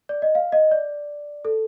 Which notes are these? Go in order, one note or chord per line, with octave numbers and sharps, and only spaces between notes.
D5
D#5
F5
D#5
D5
A4